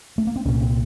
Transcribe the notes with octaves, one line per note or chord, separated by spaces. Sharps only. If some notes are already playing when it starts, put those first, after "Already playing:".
A3
A#3
C4
C2 A#2 C#4
C4